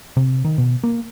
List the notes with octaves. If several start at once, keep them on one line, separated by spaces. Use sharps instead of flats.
C3
D#3
B2
A#3